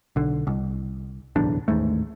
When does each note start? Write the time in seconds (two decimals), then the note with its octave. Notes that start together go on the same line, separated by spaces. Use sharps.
0.16 B1 D3
0.47 C2
1.36 D1 B1 E2 D4
1.68 A1 D#2 G#2 A3